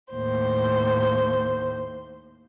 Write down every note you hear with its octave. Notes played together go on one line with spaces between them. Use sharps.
D#2 A2 C5